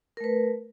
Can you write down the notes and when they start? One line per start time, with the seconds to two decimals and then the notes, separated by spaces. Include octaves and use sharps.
0.17 A#4
0.21 A3
0.24 B4